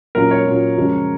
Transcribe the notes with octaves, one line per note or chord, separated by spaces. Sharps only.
A#2 F#3 C#4 F4 A#4
C#5
A#2 F#3 C#4 F4
F#2 C#3 F3 G#3 C#4